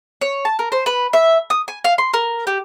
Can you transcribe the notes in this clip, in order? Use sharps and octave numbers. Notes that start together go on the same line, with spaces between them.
C#5
A5
A#4
C5
B4
E5
D#6
G#5
F5
C6
A#4
G4